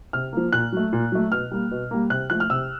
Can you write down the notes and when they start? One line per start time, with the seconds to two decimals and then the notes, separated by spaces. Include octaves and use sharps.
0.13 C3 F6
0.33 F3 A#3
0.52 A#2 F#6
0.72 F#3 A3
0.93 A#2
1.12 F#3 A3
1.32 B2 F6
1.51 G3 A#3
1.71 B2
1.91 G3 A#3
2.10 C3 F#6
2.30 F3 A3 F#6
2.40 F6
2.50 C3 E6